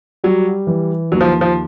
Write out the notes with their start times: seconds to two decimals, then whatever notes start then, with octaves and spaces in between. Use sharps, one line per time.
0.24 F#3 G3
0.67 E3
1.12 D#2 F#3
1.21 F3
1.41 F3